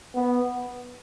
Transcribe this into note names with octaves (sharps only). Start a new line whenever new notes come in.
B3